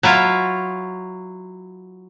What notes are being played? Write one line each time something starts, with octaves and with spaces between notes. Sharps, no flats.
F#3 E4 F4